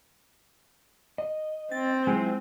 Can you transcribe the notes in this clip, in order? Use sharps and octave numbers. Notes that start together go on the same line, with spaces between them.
D#5
C4 A6
F#3 G#3 E4 F4